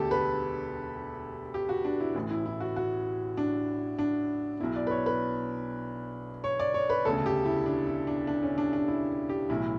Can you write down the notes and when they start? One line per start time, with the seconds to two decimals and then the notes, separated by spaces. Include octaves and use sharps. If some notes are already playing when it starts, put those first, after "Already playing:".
Already playing: E1 D2 D3 G4 A4
0.11 B4
1.54 G4
1.69 F#4
1.84 D4
2.00 E4
2.15 A1 A2 E3
2.31 E4
2.46 E4
2.60 F#4
2.76 F#4
3.37 D4
3.98 D4
4.60 B1 B2 E4
4.76 D5
4.87 B4
4.91 C#5
5.06 B4
6.44 C#5
6.60 D5
6.74 C#5
6.90 B4
7.05 E1 D2 C#3 A4
7.26 G4
7.45 E4
7.66 D4
7.87 E4
8.07 D4
8.27 D4
8.43 C#4
8.58 D4
8.73 D4
8.88 E4
9.29 G4
9.49 B1 A2 E3 E4